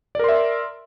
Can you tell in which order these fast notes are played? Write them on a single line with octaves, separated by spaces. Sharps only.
D5 A#4 C6 E5